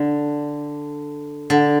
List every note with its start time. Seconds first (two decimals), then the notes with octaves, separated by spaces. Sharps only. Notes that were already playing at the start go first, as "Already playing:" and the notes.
Already playing: D3
1.50 D3